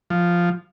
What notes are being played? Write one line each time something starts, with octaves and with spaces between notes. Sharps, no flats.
F3